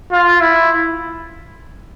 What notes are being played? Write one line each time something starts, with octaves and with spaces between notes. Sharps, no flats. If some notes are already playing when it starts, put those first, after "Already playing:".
F4
E4